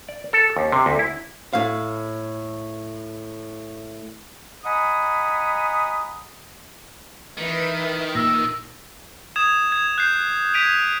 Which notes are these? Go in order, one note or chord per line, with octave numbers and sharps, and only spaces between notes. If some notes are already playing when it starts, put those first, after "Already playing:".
D5
A4
D#2
C3
D2
E4
A2 F5
D#5 F#5 G#5 A#5 B5 D#6
D#3 E3 B4
A#2 E6 A#6
D#6 G#6 E7
G#6
F#6 G6 C7
G#6 B6 D7 D#7 F7